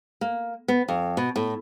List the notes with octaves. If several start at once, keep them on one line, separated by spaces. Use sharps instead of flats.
A#3
B3
F2
B2
A2